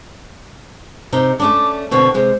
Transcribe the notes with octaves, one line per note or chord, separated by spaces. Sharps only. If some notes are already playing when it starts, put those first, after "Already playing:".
C3 D#4
A3 C#4 D4 D6
B2 D3 C4 C#6
C3 G#3 C5